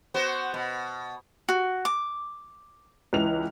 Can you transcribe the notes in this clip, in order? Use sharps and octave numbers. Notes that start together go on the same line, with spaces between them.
B3 F#4 C5
B2
F#4
D6
C#2 E3 F7